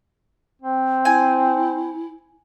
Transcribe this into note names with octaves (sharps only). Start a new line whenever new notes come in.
C4
E4 G#5